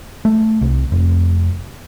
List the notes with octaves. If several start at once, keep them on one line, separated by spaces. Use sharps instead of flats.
A3
C2
F1